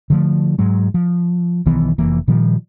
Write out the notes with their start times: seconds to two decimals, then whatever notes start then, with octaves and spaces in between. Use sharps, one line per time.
0.10 D3 F3 A3
0.59 G#2 F#3 G#3
0.94 F3
1.66 B1 D#3 E3 B3
1.98 F1 E3 A#3
2.28 A#2 D#3 F3 G3